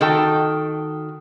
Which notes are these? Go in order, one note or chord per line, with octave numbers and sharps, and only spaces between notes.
D#3 F#4 A4 G5